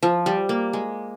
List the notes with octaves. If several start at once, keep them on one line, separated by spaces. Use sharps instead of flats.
F3
G3
A#3
G#3